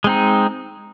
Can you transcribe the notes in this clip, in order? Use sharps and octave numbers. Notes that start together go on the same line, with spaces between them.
G#3 C4 D#4